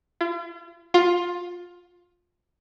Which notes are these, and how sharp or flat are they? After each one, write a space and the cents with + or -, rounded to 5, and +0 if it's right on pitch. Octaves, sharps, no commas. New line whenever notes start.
F4 -45
F4 +15